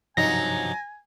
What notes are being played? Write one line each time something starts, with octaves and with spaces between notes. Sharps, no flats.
G2 C3 F3 F#3 D#4 G#5 A#6